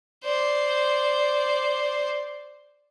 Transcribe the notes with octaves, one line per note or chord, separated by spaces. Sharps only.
C5 D5